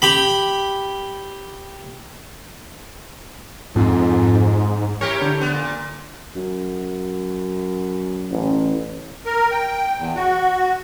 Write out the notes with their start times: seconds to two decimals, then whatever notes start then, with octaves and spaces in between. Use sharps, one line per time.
0.02 G4 B5
3.76 F2 G#2
5.01 E4 G4 A#4 C#5
5.21 D3
5.41 B3
5.53 A#2
6.36 F#2
8.31 A1
9.26 A#4
9.51 G5
9.99 E2
10.16 F#4